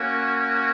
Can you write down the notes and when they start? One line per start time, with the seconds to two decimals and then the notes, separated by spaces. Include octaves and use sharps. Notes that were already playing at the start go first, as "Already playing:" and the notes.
Already playing: A#3 C#4 F#4